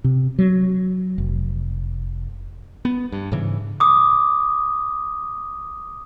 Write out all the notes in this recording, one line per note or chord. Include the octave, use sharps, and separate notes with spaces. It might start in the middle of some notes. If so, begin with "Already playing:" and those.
C3
F#3
F1
B3
G2
G#2 C#3 E3
D6 D#6